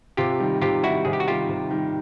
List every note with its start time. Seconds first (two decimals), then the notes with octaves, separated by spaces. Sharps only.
0.17 C3 F4 G4
0.40 D#3 G3
0.61 C3 F4 G4
0.83 D#3 G3 E4 F#4
1.05 C3 G#4
1.13 G4
1.20 F#4
1.27 D#3 G3 F4 G4
1.49 C3
1.71 D#3 G3